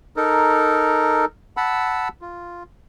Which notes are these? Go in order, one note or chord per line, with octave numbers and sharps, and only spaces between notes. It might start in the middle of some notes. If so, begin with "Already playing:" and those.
D#4 A4 A#4
F#5 A5 B5 E6
F4